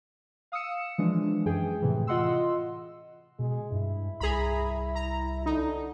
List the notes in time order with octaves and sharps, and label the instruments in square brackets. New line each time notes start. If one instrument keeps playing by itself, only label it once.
[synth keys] F5 D#6 E6 C#7 E7
E3 F3 G#3 D4
F#2 E3 G#4 G5
A2 C3 E3
F4 D#5 F#5 C6 E6
[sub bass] B2 [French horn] G#3
[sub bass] G2 [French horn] E4
[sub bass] C2 [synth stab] G#4 A#5 B5
[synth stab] A#5
[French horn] D3 [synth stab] D#4